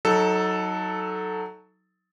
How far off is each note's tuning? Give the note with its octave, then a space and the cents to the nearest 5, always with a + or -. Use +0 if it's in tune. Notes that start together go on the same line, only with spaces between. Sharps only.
F#3 +0 D#4 +25 A4 +0